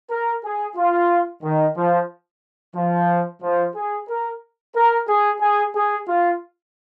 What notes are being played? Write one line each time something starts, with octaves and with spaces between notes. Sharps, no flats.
A#4
G#4
F4
D#3
F3
F3
F3
G#4
A#4
A#4
G#4
G#4
G#4
F4